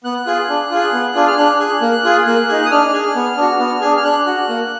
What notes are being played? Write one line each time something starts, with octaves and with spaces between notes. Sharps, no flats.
B3 F#6
F4 G#4
D4
F4 G#4
B3
D4 F4 G#4
F6
D4 F#6
G#4
A#3
F4 G#4
A#3 F#6
D#4 G#4
D#6
D4 F6
G#4
B3
D4 F#4
B3
D4 G#4
F6
D4 F#6
F#4
A#3